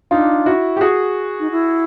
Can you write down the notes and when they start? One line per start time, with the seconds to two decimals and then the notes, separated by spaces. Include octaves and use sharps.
0.11 D4 D#4 F4
0.46 E4 F#4
0.77 G4
0.81 F#4 G#4
1.40 D#4
1.51 E4